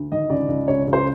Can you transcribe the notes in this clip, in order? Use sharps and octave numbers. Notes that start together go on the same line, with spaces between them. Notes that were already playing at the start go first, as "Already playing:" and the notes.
Already playing: D2
D#3 D#5
C#2 D5
C#2
C#2 C#5
C#2
C5